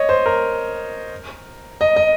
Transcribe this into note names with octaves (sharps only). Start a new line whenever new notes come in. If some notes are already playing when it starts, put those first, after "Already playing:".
Already playing: C#5 D#5
C5
A#4
D#5
D#5